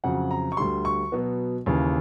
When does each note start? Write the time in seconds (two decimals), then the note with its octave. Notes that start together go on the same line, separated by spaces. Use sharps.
0.04 F2 C#3 F#3 F#5
0.31 A#5
0.52 C#6
0.57 D2 D3 G3 C6
0.85 C#6
1.12 B2 F#3 B3
1.66 D#2 C#3 E3